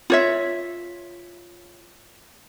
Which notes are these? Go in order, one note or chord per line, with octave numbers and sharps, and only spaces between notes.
F4 C#5 E5